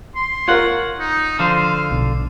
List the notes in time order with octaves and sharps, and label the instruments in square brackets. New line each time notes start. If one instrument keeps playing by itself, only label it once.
[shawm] C6
[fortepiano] F4 A#4 [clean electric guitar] C#5 F#5
[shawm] D#4
[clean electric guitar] D3 F3 C5 [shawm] F5
[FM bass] B1